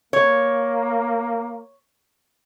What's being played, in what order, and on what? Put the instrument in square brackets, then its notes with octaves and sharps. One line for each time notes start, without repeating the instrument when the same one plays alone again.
[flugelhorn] A#3 [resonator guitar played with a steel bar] C#5